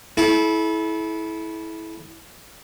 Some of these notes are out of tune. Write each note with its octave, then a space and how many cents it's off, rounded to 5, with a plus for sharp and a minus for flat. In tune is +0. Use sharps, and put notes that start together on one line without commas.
E4 -15 A4 -35